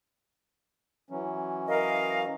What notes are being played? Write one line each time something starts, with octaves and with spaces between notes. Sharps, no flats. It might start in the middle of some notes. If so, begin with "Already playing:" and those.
E3 F#3 C#4
A#4 D#5 F5